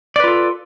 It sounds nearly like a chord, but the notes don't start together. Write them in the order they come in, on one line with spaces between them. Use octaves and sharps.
D5 B4 F4 A4